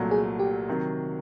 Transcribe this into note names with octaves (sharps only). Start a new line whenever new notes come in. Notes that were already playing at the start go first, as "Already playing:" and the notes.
Already playing: C2 A#2 F#3 A3
G#4
G4
C3 D#3 F#3